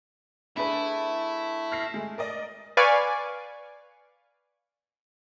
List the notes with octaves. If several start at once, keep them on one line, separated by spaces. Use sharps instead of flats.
A3 D4 E4 G#4 B4
F6 A#6 C7
G#3 A3
A#4 D5 D#5
B4 D5 F5 G#5 C#6 D6